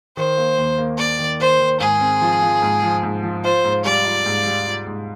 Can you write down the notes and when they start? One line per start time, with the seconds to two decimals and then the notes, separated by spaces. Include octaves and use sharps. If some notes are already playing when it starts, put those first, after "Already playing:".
0.17 D#3 C5
0.37 A#3
0.58 D#2
0.78 A#3
0.98 A#3 D5
1.19 D#3
1.40 D#3 C5
1.60 D#3
1.80 G#2 G#4
2.01 C4
2.22 F3
2.42 F3
2.62 G#2
2.83 F3
3.03 G#2
3.23 F3
3.44 F4 C5
3.64 G#2
3.85 G3 D5
4.05 F4
4.26 G#2
4.47 G3
4.66 F4
4.87 G#2